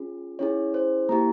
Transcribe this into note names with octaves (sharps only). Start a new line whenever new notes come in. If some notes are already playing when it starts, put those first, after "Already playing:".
Already playing: C#4 F4 G#4
C#4 E4 G#4 C#5
C5
A#3 E4 G4 A#5